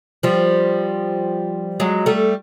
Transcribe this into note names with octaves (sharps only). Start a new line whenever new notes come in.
F3 G3
F#3 G#3
G3 A3